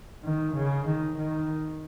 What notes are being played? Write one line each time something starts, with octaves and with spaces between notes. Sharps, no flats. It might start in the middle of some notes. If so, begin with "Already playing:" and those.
D#3
C#3
D#3
D#3